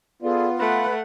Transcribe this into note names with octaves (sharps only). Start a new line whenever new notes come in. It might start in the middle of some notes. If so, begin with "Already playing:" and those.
B3 F4 G#4 A4 D5
A3 B4 F#5